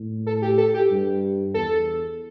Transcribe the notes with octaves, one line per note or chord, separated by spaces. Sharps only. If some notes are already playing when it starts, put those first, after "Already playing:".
Already playing: A2
A4
G4
A4
G4
G2
E2 A4